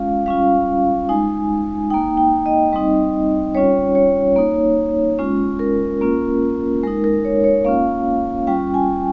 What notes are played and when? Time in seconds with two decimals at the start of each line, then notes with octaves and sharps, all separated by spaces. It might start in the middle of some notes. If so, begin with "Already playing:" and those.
Already playing: G#3 C#4 F4 F5
0.26 G3 C#4 F4 F5
1.09 G#3 D#4 G#5
1.90 A#3 D#4 G5
2.17 G5
2.46 D#5
2.72 G3 C4 D#4
3.55 G3 C#4 F4 C#5
3.95 C#5
4.36 A#3 D#4
5.19 G#3 C#4 F4
5.59 A#4
6.01 A#3 C#4 F4
6.83 G#3 D#4 A#4
7.04 A#4
7.25 C#5
7.44 C#5
7.65 A#3 C#4 F4 F5
8.47 G3 C#4 F4 G5
8.74 G#5